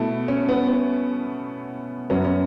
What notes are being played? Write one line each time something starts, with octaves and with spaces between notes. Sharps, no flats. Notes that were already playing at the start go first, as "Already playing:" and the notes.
Already playing: B2 A3 E4
C#4
B3
B3
F#2 F#3 B3 C#4
C#4